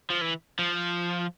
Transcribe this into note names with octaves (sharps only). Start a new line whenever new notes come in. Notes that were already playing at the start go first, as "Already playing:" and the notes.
F3
E3
F3